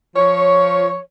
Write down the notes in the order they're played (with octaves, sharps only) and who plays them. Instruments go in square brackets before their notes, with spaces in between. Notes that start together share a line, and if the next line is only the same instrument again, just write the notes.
[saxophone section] F3 C#5